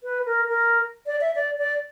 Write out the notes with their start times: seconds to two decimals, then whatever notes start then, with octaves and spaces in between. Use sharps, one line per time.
0.03 B4
0.26 A#4
0.48 A#4
1.06 D5
1.21 E5
1.35 D5
1.58 D5